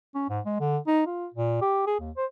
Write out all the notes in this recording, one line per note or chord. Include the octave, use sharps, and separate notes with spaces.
C#4
G#2
G#3
D3
D#4
F4
A#2
G4
G#4
D#2
C5